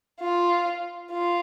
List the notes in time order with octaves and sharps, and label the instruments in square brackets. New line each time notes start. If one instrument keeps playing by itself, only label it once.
[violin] F4
F4